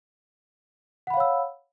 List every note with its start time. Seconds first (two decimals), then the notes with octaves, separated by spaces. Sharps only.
1.07 F#5
1.10 B5
1.14 F5
1.17 C#5
1.20 E6